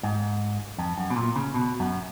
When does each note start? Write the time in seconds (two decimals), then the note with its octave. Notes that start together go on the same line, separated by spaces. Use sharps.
0.03 G#2
0.78 F2
0.98 F#2
1.10 B2
1.16 A#2
1.36 C#3
1.54 B2
1.80 F#2